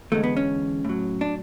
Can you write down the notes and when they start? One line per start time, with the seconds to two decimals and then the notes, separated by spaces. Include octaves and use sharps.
0.12 E2 D3 G#3 A3
0.24 B3
0.37 C#4
0.85 A2 F#3
1.21 D4